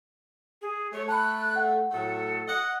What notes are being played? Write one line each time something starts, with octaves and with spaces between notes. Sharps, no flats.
G#4
A3 C#5
A5 B5 F#6
F#5
A2 F#3 A3 A4
D#5 F#5